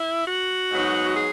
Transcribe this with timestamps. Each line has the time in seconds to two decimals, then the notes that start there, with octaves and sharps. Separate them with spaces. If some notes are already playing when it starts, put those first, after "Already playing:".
Already playing: E4
0.27 F#4
0.70 G#2 F#3 B3 D#4
1.14 G#4